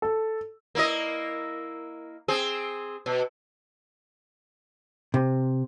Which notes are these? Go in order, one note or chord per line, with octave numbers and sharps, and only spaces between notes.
A4
A#3 E4 D#5
C4 G#4
B2
C3